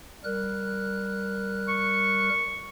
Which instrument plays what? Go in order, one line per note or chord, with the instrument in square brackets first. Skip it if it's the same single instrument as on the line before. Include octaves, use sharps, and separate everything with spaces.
[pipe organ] G3 A#4 F#6
[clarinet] C#6